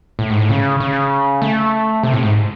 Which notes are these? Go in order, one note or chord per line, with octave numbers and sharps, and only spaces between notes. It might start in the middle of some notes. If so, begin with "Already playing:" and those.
A2
G#2
A2
C#3
C#3
A3
C3
A2
G#2